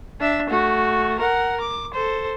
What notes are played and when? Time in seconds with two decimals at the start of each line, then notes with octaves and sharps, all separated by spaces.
0.20 D4 E5
0.50 A3 F#4
1.19 A#4 F#5
1.61 D6
1.94 A4 C5